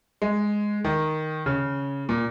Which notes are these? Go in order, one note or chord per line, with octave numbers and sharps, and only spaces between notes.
G#3
D#3
C#3
A#2